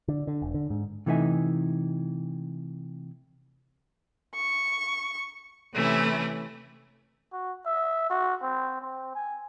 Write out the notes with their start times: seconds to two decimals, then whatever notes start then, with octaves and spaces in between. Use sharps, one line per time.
0.08 D3
0.27 D3
0.42 E1
0.54 D3
0.70 G#2
1.06 C3 E3 A3 D#4 E5 G#5
4.35 C#6
5.74 C3 E3 A3 C#4 E4
7.33 F#4
7.66 E5
8.10 F#4
8.42 C4
8.82 C4
9.15 G#5